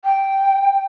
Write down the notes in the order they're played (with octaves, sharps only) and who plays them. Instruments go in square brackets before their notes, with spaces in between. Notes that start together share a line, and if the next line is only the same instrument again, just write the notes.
[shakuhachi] G5